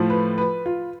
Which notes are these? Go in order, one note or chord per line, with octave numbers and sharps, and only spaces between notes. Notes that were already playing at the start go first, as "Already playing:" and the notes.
Already playing: A2 F3 A3
B4
B4
F4